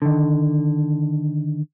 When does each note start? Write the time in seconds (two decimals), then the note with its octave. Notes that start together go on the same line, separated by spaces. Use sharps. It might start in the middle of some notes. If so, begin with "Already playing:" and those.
0.02 D3 D#3